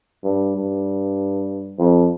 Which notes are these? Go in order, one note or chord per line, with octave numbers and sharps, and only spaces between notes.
G2
G2
F2